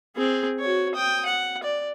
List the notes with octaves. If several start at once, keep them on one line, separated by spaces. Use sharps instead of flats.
C4 G#4
F#4 C#5
G5 D#6
F#5
D5